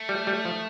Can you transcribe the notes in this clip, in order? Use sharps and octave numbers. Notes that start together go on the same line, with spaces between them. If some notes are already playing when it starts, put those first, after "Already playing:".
Already playing: A3
G3
G3
F3